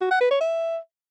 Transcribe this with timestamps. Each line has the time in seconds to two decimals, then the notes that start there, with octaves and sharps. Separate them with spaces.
0.01 F#4
0.11 F#5
0.21 B4
0.31 C#5
0.41 E5